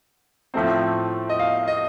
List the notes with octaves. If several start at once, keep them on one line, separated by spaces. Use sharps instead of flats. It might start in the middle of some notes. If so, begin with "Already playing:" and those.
A2 F3 A3 C4
D#5
F5
D#5